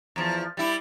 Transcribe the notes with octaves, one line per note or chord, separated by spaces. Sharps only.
E2 F3
G3 E4